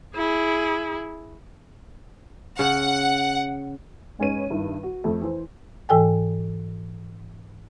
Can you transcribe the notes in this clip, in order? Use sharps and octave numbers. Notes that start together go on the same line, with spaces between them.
E4 G#4
C#3 F#5
G#2 G#3 C#4 B4 C#5 D#7
G2 D#3 E4
F#4
F2 A3
E3 C5
G#2 E3 A4 G5 G#5